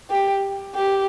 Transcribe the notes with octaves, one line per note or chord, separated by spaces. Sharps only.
G4
G4